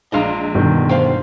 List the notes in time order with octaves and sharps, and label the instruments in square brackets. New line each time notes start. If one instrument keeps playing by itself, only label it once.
[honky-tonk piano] A#1 G#3 D4 [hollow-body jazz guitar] D#5 F5 A#5
[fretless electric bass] G2 G3 [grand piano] B2 D3 D#3
[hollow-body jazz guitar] F4 C5 G5